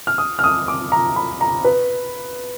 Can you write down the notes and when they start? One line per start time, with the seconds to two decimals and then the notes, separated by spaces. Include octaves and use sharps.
0.07 F6
0.18 D#6
0.39 F6
0.44 D#6
0.68 D6
0.92 A#5
1.16 B5
1.41 A#5
1.65 B4